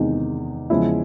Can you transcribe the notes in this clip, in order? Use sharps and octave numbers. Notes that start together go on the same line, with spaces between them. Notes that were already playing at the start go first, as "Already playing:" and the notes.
Already playing: E2 C3 D#3 G#3 D#4
E2 C#3 F3 G#3 E4